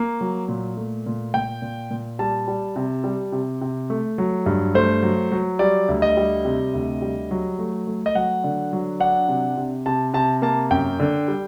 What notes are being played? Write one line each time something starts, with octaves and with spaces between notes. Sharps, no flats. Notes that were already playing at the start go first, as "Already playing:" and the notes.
Already playing: A#3
F#3
A#2
A3
A#2
A#2 G5
A#2
A#2
G3 A5
G3
C3
G3
C3
C3
A3
F#3
G2
A3 C5
F#3
F#3
G3 D5
D2
D#5
G3
C3
D2
G3
F#3
A3
A3
D#5
F#3 F#5
D3
F#3
D4 F#5
C3
C3
C3 A5
C3 A5
A#3 A5
F#2 G5
D3
G3